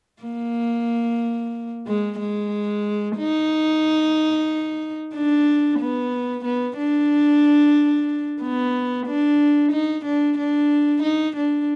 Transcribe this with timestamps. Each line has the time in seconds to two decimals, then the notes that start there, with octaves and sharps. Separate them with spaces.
0.23 A#3
1.87 G#3
2.20 G#3
3.18 D#4
5.14 D4
5.80 B3
6.45 B3
6.78 D4
8.42 B3
9.07 D4
9.72 D#4
10.05 D4
10.38 D4
11.03 D#4
11.37 D4